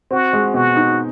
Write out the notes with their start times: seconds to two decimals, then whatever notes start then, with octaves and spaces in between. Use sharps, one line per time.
0.11 C4 F#4
0.33 G#3
0.54 B2 F#4
0.77 D#4